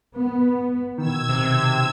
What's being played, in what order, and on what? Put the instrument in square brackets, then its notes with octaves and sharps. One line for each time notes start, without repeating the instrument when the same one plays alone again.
[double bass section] B3
[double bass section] B2 [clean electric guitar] D#3 [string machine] E6 G#6
[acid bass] C3